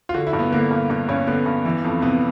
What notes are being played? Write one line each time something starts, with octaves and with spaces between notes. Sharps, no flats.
F4
D3 F#4
E4
G2
B3
D3 A#3
G2
G2
G2 C#4
D3 B3
G2
E3
F2
C3 B3